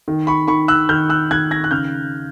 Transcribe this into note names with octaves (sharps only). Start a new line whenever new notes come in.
D#3
B5 C#6
D#3 B5 C#6
E6 F#6
D#3 F6 G6
E6 F#6
D#3 F#6 G#6
G#6 A#6
F#6
C#3 F6 G6